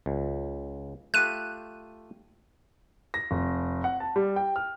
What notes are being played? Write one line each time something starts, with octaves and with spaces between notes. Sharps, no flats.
C#2
A3 F4 G4 F#6 D#7
A#6
F1
F#5
A5
G3
G5
F6